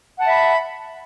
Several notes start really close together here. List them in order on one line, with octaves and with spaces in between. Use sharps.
F#5 A5 E5 B5